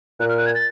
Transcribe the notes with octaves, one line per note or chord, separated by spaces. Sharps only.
A#2 F#6
F6
F#6
G#6
A6